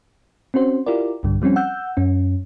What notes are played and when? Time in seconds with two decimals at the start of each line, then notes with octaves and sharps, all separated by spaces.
0.54 C4 C#4 F#4 C5
0.86 E4 F4 G4 A#4 D5
1.23 B1 G2 D3 G3
1.42 F3 G3 C4 C#4
1.56 F#5 E6 G6
1.97 F#2 C#4